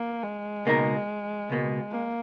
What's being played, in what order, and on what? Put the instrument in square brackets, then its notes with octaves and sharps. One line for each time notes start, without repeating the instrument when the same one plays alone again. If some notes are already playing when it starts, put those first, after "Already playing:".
Already playing: [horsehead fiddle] A#3
G#3
[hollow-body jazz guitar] C#2 B2 A#3 D#4 A#4
C#2 B2 A#3
[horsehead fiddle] A#3